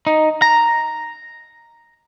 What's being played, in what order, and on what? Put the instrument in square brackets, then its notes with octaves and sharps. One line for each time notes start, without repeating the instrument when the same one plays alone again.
[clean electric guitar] D#4
A#5